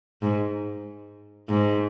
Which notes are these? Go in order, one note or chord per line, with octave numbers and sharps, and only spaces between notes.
G#2
G#2